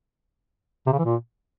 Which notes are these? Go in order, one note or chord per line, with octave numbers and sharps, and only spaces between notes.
C3
C#3
E3
A#2